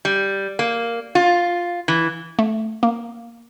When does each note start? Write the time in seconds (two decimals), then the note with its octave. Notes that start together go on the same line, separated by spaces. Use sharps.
0.05 G3
0.59 A#3
1.15 F4
1.88 E3
2.39 A3
2.83 A#3